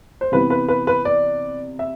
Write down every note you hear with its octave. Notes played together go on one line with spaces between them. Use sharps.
C5
C3 E3 B3 B4
B4
B4
B4
D5
E5